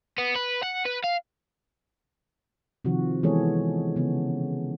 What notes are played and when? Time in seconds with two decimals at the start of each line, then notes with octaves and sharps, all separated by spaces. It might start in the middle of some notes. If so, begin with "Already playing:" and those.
0.18 B3
0.35 B4
0.63 F#5
0.85 B4
1.04 F5
2.85 C3 D#3 F3 F#4
3.23 E3 G#3 B3 G#4 A4 C#5
3.96 C#3 B3